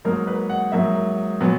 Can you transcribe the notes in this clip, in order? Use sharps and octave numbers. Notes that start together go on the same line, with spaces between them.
G#2 F#3 A#3 A#4
B4
F#5
G#2 F#3 A#3 E5
A#2 F#3 B3